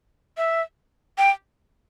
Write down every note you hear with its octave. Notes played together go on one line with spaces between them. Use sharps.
E5
G5